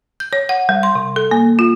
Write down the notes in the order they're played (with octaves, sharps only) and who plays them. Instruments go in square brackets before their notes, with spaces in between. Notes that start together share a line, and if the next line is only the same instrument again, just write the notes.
[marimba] G6
C#5
F#5
G3
C6
C3
A4
A#3
F4